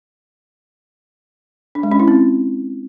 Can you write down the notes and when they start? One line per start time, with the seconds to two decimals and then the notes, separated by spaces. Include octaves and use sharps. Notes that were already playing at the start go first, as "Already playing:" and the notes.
1.75 D4
1.83 G#3
1.91 C#4
2.00 E4
2.08 C4